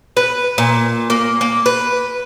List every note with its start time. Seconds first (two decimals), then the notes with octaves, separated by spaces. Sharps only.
0.17 B4
0.58 A#2
1.10 A#3
1.41 A#3
1.66 B4